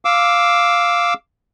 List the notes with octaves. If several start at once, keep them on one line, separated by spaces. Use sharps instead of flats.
F5 D6 E6